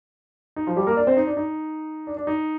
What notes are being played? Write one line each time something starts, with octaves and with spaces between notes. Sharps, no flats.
D#4
F3 F4
G3 G4
A#3 A#4
D4 D5
C4 C5
D#4
D4
D#4
D4
D4
D#4